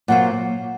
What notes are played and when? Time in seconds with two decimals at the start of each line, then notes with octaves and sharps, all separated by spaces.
0.08 A#2 F#3 A#3 F4 C5 F#5